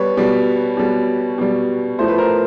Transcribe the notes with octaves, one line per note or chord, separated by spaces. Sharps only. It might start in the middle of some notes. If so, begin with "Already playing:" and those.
Already playing: B2 G3 B4 C#5
B2 G3
B2 G3
B2 G3
A2 F3 A3 C5
B4
A#4 C5